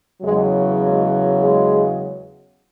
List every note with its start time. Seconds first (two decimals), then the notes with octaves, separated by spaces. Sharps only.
0.22 E2 C#3 F#3 G#3
0.81 G#3
1.40 G#3